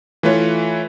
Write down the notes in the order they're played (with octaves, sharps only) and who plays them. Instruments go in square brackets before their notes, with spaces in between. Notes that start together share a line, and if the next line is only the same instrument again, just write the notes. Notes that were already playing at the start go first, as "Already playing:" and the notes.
[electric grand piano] E3 A3 F4 B4 C#5